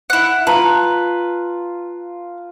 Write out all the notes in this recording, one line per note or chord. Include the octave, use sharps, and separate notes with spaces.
E4 F#5
F4 B4 A5 A#5